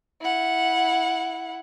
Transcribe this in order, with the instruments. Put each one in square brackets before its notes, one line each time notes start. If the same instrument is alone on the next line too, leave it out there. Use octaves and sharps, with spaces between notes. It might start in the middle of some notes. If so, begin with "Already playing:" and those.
[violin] E4 F#5